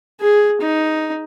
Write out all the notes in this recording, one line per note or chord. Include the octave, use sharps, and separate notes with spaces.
G#4
D#4